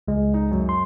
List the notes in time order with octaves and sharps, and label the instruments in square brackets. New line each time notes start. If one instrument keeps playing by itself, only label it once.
[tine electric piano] C#2 G#3
[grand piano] D#4
F#2
[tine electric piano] C6